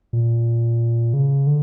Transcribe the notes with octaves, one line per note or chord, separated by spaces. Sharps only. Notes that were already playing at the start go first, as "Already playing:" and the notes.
A#2
C#3
D3